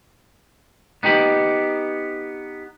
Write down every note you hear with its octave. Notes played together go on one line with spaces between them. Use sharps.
B3 D#4 G4 B5